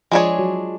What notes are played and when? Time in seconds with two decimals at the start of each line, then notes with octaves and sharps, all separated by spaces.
0.11 F3 G#3 D4 G#4 C#5
0.39 F#3